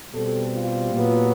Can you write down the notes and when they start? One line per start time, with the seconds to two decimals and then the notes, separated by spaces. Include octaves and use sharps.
0.14 B2 G3 C4 G4 A4
0.53 F4 G4
0.92 A#2 F#3 B3